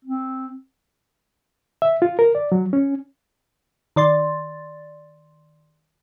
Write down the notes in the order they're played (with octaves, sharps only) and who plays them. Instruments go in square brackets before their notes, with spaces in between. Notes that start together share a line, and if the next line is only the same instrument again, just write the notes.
[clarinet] C4
[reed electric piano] E5
F4
A#4
D5
F#3
C#4
[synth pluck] D#3 D5 C6 A6